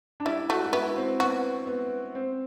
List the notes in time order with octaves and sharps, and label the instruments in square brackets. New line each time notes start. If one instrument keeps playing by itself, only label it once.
[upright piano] D4
[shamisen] G3 [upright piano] E4
[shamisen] A3 [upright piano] F#4
[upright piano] F#4
[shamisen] B3 [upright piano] E4
[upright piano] C4
[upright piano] B3 [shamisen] F#4
[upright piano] B3
C4